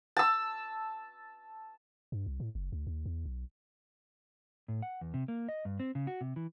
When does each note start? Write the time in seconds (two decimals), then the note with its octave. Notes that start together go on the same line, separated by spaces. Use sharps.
0.17 A5 E6
2.12 G2
2.26 C2
2.40 A2
2.55 F#1
2.72 D2
2.87 D#2
3.06 E2
3.25 B1
4.68 A2
4.82 F#5
5.01 E2
5.14 C3
5.28 A#3
5.49 D#5
5.65 G2
5.80 C4
5.95 C#3
6.07 F#4
6.21 C3
6.36 E3